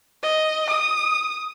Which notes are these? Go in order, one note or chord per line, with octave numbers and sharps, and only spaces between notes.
D#5
D#6